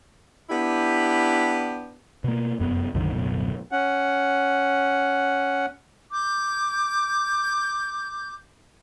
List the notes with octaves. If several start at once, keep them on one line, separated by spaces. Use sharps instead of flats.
B3 D4 E4 G4
B2 A#3
F1 F#2 B3
B1 F#2 D3 D#3
D1 F#2 B2
C#4 F#5
D6 G6